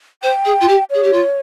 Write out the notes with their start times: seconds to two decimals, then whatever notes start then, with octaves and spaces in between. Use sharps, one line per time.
0.23 C5 G5
0.45 G#4
0.61 F4
0.68 G4
0.90 G#4 C#5
1.03 G4
1.13 F4